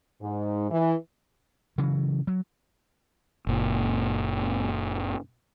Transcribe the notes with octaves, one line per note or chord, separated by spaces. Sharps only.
G#2
E3
C#3 E3 F#3
F#3
F#1 A#2